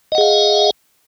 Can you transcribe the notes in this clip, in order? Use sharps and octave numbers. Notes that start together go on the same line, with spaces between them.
G#4 D#5 F5 F#5